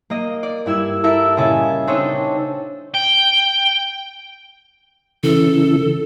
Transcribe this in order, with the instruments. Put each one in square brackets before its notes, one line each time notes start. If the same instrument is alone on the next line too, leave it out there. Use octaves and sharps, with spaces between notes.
[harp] A#3 D#5
D5
G2 E4 E6 G#6 E7
E4 A4 A#4 E5 E6
A#2 C#3 D#5 E5 G#5 A6
C4 D4 D#4 A4 C#5 D#5
[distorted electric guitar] G5
[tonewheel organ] C#3 E3 [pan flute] A4